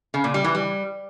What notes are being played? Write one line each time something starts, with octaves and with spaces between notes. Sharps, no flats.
C#3
A#2
G3
E3
G3